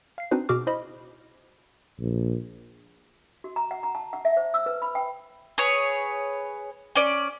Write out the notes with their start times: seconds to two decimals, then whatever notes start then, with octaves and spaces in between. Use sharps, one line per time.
0.18 F5 C7
0.31 C4 D4 D#4 F#4 B4 C5
0.49 B2 F#4 G#4 D6 F6
0.67 E4 C5 D#5 B5
2.00 A#1
3.44 F#4
3.56 A#5
3.71 F#5
3.83 A#5
3.95 A5
4.13 F#5
4.25 E5
4.37 C5
4.54 E6
4.66 B4
4.82 B5
4.95 G5
5.58 G#4 B4 C#5
6.95 C#4 D5